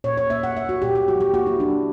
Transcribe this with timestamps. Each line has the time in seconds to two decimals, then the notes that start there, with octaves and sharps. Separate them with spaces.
0.04 A#2 C#5
0.17 C#5
0.30 A#3 E5
0.43 F#5
0.57 A#3 E5
0.69 F#4
0.82 A#2 G4
0.95 G4
1.08 F#3 F#4
1.21 G4
1.33 A#3 F#4
1.46 E4
1.60 F#3 D4